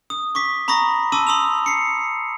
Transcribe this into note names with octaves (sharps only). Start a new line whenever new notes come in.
D#6
C#6 D6 B6
A#5 B5 C#6 D#6 A#6
A5 C6 D6 E6 D#7
C6 D#6 E6 F7
C7 C#7